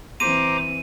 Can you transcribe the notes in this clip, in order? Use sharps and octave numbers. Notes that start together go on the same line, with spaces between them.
E3 C4 C5 A#5 D6 D#7